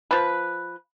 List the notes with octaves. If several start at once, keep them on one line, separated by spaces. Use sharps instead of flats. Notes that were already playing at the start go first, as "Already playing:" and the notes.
F3 B4